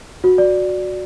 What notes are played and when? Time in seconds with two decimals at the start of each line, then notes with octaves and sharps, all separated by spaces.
0.24 F#4
0.38 D5